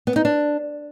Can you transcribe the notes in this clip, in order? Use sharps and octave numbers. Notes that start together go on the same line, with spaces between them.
B3
D#4
D4